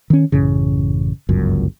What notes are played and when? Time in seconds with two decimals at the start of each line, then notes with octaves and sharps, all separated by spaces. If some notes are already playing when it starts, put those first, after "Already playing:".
0.10 D#3 C#4
0.32 A1 F#2 C#3
1.29 G1 C#2 F#2